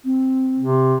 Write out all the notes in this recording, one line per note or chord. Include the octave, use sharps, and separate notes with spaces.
C4
C3